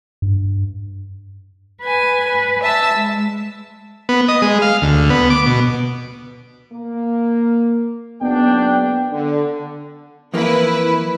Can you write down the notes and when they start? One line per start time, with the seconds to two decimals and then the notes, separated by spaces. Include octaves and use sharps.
0.22 G2
1.81 B4 G#5
2.28 B4
2.63 E5 A5 E6
2.93 G#3
4.09 B3
4.28 D#5
4.42 G#3
4.62 F5
4.82 D2
5.10 B3
5.30 D6
5.46 B2
6.73 A#3
8.21 F#1 B3 D4 G5
9.12 D3
10.34 F2 E3 A#3 E4 B4